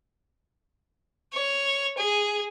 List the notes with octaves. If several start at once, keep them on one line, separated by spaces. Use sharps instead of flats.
C#5
G#4